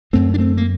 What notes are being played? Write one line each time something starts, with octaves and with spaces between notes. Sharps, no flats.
F#2 D3 A3 C4
D4
A3 C4
A#3